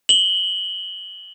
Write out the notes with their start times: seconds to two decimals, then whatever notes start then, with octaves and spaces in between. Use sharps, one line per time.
0.09 F#7 G7